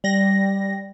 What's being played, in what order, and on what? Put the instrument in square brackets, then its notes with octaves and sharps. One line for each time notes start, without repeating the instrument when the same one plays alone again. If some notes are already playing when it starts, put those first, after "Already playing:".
[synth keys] G3 A#6